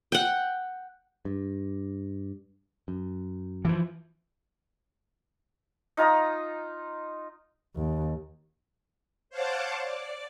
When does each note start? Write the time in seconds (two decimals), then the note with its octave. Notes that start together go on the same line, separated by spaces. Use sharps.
0.12 F#5 G5
1.25 G2
2.88 F#2
3.65 E3 F3
5.97 D#4 F4 A#5 D#6
7.76 D#2
9.30 C5 C#5 F5 F#5 A5 D6
9.83 D5